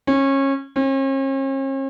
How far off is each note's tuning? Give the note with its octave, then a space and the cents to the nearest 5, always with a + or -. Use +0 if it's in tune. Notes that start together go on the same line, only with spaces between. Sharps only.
C#4 -25
C#4 -45